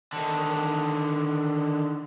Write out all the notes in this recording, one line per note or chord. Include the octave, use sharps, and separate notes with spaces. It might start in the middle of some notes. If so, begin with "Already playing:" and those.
D3 D#3